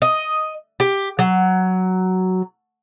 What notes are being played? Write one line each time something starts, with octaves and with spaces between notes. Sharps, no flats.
D#5
G4
F#3